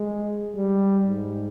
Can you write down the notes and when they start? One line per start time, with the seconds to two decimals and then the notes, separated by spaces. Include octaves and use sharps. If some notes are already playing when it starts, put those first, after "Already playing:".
Already playing: G#3
0.55 G3
1.07 G#2